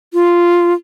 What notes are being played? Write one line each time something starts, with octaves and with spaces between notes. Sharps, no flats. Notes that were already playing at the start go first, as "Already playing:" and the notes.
F4